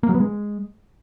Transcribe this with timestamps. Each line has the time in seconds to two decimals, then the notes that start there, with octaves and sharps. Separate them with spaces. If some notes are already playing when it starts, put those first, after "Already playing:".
0.03 A#3
0.09 F#3
0.15 B3
0.20 G#3